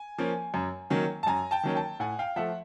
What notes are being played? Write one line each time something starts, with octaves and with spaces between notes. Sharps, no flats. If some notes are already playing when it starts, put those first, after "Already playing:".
Already playing: G#5
F3 A#3 C#4
F#2
D#3 F#3 A#3 C#4
A5
F#2 G#5 A#5
G5 A5
D#3 F#3 A#3 C#4
G5 A5
A2 F#5 G#5
F5 G5
F3 A3 E5 F#5